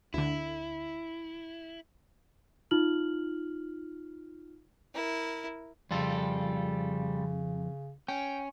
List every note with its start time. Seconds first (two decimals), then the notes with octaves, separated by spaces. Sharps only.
0.14 D2 D3 E4
2.71 D#4 F4 F6 F#7
4.94 E4 A#4
5.91 F2 C#3 G3 F4 A4
8.08 C#4 G5